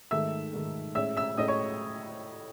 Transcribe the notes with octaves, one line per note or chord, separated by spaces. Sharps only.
G#2 D#3 A3 E5 E6
G#2 D#3 A3
A2 G#3 C#4 E5 E6
E5 E6
A2 G#3 C#4 D#5 D#6
C#5 C#6